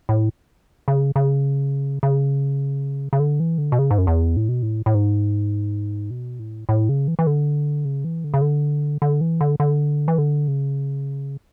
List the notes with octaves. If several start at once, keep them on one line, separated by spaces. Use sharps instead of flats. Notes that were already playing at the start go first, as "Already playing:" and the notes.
A2
C#3
C#3
C#3
C#3
D3
E3
D3
B2
C#3
G#2
F#2
E2
A2
B2
A2
A2
G#2
B2
A2
A2
C#3
E3
E3
D3
C#3
E3
D3
C#3
D3
D3
E3
D3
D3
E3
D3
C#3